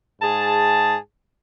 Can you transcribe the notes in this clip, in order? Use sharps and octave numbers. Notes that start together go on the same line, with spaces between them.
G#2 G#4 A5